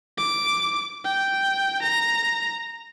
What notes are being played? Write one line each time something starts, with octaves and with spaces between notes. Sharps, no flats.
D6
G5
A#5